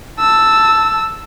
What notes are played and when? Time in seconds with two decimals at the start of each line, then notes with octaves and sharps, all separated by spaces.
0.20 A5 E6